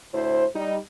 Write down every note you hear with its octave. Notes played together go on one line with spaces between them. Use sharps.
D2 A2 E4 C5
G3 D#4